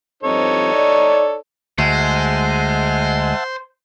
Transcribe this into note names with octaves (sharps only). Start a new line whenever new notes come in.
G2 F3 C4 D#4 A4 C#5
D5
D2 G#3 C5 E5 F#5 A5